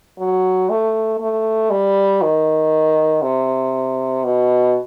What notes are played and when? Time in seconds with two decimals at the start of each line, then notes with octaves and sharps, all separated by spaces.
0.18 F#3
0.70 A3
1.20 A3
1.70 G3
2.22 D#3
3.22 C3
4.24 B2